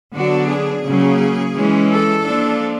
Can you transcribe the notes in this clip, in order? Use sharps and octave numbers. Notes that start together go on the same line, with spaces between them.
D3 F#3 B3 D4 F#4
G#4
C#3 F#3 A#3 C#4
E3 G#3 C#4
A4
F3 A#3 D4